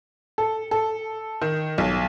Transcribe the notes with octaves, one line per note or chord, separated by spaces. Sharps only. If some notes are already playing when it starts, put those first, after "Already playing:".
A4
A4
D#3
B1